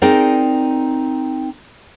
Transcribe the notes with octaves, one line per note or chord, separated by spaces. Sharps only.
C4 D#4 G#4 A#4 D5